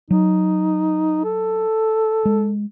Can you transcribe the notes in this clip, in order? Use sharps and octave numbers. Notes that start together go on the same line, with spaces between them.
F#3 D#4
A4
G#3